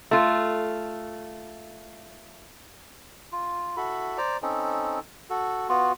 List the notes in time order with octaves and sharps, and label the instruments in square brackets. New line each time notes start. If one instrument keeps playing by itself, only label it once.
[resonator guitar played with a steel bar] A3 F4
[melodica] F4
E4 F#4 A4 B5
C5 D5 A#5
C4 C#4 D#4 A4
F#4 A4
B3 F4 F#4